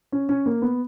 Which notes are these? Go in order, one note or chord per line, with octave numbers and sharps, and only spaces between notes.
C#4
C#4
A#3
B3